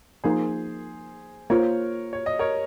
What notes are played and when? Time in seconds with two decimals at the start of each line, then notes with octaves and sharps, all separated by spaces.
0.24 F3 A#3 D#4 G#4 C5
1.50 A#3 F4 A#4 C5 C#5
2.13 C#5
2.26 D#5
2.39 A#4 C#5